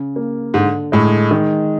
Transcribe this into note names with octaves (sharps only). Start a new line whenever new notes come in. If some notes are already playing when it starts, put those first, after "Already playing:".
Already playing: C#3
A#3
G#2 D3
A2 G#3
D#3